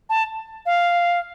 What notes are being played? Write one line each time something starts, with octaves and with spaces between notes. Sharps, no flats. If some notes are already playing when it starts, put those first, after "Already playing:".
A5
F5